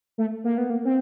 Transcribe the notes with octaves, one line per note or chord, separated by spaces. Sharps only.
A3
A#3
B3
A#3
C4